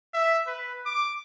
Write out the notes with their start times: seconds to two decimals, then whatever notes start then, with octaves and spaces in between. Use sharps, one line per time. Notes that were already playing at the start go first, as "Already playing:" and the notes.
0.14 E5
0.47 B4
0.86 D6